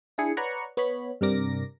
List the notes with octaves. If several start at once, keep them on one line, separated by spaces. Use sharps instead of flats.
D4 E4 G#4 C#7
B4 C#5 D5 F#5 A#5 C#6
B3 C#5 B5
G2 C3 G3 A#4 D6 A#6